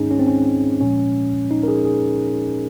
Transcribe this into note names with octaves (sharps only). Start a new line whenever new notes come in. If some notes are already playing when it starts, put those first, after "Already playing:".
Already playing: G#2 D#3 G#3 C#4 D#4 G#4
C#4
C4
C#4
A#2 F3 G#3 C#4
D#4
A#4
G#4
G#4